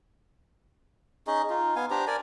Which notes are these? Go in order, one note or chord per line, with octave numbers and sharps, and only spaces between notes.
C#4 D#4 G#4 D#5
D#4 F4
B3 F5 G#5
D4 G4 C5 A#5
A#4 D5 G#5